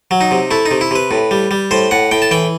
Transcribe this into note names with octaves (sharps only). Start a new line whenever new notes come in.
F#3
D#4
C3
A3 E4
D#4
C3
E4
C3 B4
A2
G3
G3
A2 C5
A2 F#5
A2 G5
A5
E3 G5